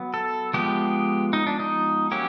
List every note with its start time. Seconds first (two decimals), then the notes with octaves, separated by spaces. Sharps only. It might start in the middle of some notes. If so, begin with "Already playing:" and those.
Already playing: F#3 B3
0.14 A4
0.53 F3 G#3 B3 G4
1.33 D#4
1.47 D4
1.60 D#4
2.11 F#3 A#3 C#4 G4